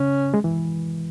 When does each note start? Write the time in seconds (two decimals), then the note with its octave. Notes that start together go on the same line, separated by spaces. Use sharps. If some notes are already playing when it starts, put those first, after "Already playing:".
Already playing: C#3 C#4
0.34 G#3
0.44 E3